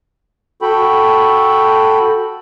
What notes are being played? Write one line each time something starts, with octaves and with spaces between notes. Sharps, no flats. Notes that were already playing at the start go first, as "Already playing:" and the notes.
F#4 A4 G5 B5